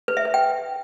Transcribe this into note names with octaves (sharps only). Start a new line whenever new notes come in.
B4
E5
B4
G5